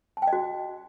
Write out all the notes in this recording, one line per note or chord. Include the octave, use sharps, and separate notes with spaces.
A5
G5
D#5
F#4